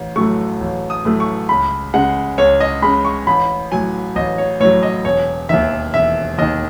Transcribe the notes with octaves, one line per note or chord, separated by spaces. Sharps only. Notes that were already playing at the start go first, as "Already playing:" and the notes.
Already playing: A1
A2 F#3 A3 C#6
A1
D#6
A2 F#3 A3
C#6
C#2 B5
C#3 G#3 F#5
C#2 C#5
D#5
C#3 G#3 B5
C#6
A1 B5
A2 F#3 G#5
A1 D#5
C#5
A2 F#3 C#5
D#5
E1 C#5
D#2 D#3 E5
E1 E5
D#2 D#3 D#5